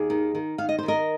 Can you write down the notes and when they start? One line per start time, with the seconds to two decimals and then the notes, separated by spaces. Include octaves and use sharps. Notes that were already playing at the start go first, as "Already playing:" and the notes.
Already playing: D#2 G#4
0.10 D#3
0.35 D#3
0.58 D#3 F5
0.69 D#5
0.79 C5
0.83 D#3
0.88 A#4 D#5